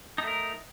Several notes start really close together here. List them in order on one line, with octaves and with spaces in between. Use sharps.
D#4 A3 A#4